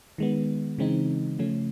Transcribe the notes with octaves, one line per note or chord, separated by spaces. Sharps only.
D#3 G#3 B3
C#3 E3 G#3 C4 D#4
C#3 F3 A3 C#4